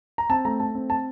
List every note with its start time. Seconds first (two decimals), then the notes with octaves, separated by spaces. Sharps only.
0.18 A#5
0.30 C4 A5
0.45 A3 A#5
0.60 A3 A5
0.75 C4
0.90 A5